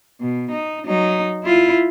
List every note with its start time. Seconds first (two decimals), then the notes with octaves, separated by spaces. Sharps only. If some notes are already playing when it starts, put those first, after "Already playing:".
0.21 B2
0.51 D#4
0.85 F#3 D#4
1.44 E4 F4